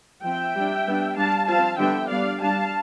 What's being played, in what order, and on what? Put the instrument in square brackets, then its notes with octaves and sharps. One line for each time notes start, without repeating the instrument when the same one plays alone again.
[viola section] F3 C4 E5 G5
G3 D4
G3 B3 D4
G3 D4 F5 A5
F3 C4 F5 A5
D3 G3 B3 E5 G5
G3 B3 D4 D5 F5
G3 D4 F5 A5